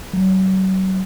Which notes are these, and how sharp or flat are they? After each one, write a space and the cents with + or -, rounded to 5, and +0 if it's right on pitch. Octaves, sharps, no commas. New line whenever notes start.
F#3 +40